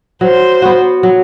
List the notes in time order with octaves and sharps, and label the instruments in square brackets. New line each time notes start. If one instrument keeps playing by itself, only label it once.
[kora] F#3 [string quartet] C5
[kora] B3 F#4
F#3